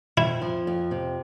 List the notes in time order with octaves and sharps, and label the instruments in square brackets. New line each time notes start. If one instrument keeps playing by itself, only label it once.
[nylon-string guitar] F2 [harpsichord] E4
[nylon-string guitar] F3
F2
C3